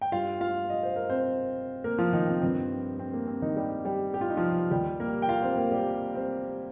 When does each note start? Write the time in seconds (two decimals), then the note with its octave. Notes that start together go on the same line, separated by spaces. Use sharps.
0.01 G5
0.12 G2 G3 F4 F5
0.41 F4 F5
0.70 D#5
0.83 C5
0.96 A#4
1.09 C4 C5
1.84 A#3 A#4
1.98 F3 F4
2.13 D#3 D#4
2.27 C4
2.42 G2 D#3 G3 C4
2.99 C4
3.14 A#3
3.27 C4
3.42 D#3 D#4
3.56 G3 G4
3.85 G3 G4
4.14 G4
4.21 F4
4.30 D#4
4.37 F3 F4
4.71 D#2 D#3 G3 G4
5.00 A#3 A#4
5.22 G5
5.29 F4 F5
5.43 C4 C5
5.57 A#3 A#4
5.72 G3 G4
6.15 C4 C5